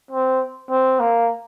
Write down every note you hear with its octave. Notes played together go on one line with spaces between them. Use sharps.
C4
C4
A#3